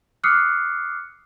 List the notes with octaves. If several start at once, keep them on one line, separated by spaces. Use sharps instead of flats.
D6 D#6 F6 F#6 C7 C#7